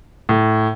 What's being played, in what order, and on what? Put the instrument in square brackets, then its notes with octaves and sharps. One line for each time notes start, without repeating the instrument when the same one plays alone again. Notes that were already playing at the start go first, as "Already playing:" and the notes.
[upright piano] A2